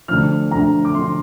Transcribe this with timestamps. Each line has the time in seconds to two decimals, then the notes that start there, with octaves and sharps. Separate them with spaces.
0.08 D2 D3 F3 F6
0.51 D2 D3 F3 A#5
0.85 D6
0.95 D3 F3 C6